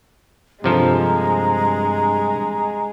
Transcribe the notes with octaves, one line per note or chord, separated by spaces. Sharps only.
G2 C3 F3 G#3 A4 A#5